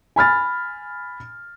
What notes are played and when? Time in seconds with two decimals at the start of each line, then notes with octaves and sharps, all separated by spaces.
0.16 G#5 B5 F6 A6